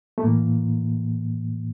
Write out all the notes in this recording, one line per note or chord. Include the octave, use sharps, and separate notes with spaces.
A3
A2 E3 A#3